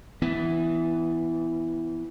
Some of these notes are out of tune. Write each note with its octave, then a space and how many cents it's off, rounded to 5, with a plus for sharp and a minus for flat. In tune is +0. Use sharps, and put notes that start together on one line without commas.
E3 +0 B3 +25